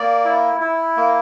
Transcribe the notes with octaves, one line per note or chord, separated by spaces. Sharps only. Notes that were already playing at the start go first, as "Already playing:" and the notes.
Already playing: A#3 D5
E4
E4
A#3